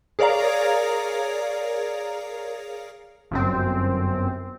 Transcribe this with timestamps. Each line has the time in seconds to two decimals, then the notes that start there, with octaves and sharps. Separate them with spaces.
0.19 G#4 A#4 C#5 D5 F5 A#5
3.31 G1 F#2 C4